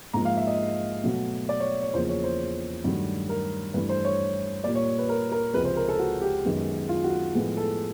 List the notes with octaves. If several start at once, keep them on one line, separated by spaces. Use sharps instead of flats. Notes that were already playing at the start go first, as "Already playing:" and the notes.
G#2 F3 A#3 A#5
F5
E5
D#5
B2 F#3 A3
D5
C#5
C#5
E2 C#3 F3 A#3 C5
C#5
C5
G2 D#3 F#3 A3
A#4
G2 E3 A3 B4
C5
C#5
A#2 G3 A#3 D5
C#5
B4
A#4
A#4
C#2 C3 F3 G#3 B4
C5
A#4
A4
F#4
G4
F#2 D#3 G#3 B3
F4
F#4
A2 F3 G#3 B3
A4